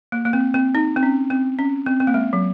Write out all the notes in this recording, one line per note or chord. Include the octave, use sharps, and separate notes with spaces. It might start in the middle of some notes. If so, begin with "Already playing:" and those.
A#3
A#3
C4
C4
D#4
C4
C#4
C4
C#4
C4
C4
A#3
G#3
F#3